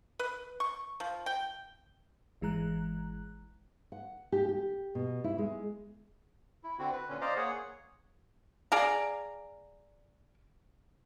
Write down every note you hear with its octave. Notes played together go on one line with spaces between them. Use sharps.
B4
C#6
F3
G5
G#1 E3 G#3 A#5 F#6
F#5
G4
G4
B2
E4
G#3
E4
D3 C4 F#4
B4
A#2 D3 C#4
C5 D5 D#5 F5 A#5
A#3 G#4 C#5 F#5
G#4 D5 F5 A#5